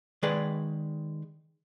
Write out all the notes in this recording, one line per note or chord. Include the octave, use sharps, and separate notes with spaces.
D#3 G#3 G#4 B4 D5